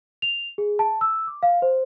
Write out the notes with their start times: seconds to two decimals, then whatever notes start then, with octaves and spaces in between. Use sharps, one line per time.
0.22 F7
0.58 G#4
0.79 A5
1.01 E6
1.27 D6
1.43 F5
1.62 C5